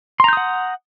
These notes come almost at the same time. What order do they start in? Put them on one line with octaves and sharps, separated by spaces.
C6 A#5 G6 D#6 F#5